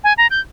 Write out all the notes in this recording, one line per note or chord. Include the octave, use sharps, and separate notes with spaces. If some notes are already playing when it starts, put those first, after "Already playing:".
G#5
A#5
G6